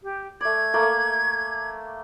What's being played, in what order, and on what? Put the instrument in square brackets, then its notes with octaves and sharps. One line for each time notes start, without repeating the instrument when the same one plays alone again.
[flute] G4
[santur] A3 D5 [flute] G#6
[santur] A3 A#3 D5